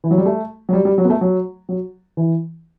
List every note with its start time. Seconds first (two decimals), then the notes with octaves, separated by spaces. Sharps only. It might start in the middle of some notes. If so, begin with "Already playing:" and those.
0.04 E3
0.11 F#3
0.18 G3
0.25 A3
0.69 F#3
0.73 G3
0.85 G3
0.98 F#3
1.05 B3
1.10 A3
1.21 F#3
1.69 F#3
2.17 E3